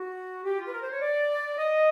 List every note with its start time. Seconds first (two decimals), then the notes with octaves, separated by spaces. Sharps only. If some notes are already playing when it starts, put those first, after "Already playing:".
Already playing: F#4
0.44 G4
0.58 F4
0.66 B4
0.72 A#4
0.82 C5
0.91 C#5
1.01 D5
1.58 D#5